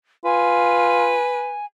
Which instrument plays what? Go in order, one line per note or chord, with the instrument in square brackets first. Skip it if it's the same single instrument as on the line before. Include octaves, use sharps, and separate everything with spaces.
[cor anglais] F4 [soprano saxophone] B4 [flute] G#5